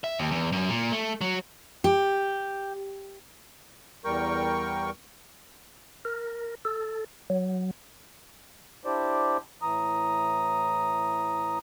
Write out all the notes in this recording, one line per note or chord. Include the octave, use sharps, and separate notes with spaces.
E5
D#2
E2
F#2
A#2
A3
F#3
G4
E2 G3 A#4 G5 C#6
A#4
A4
F#3
D4 E4 G4 C5 D5
A2 E3 A#5 D#6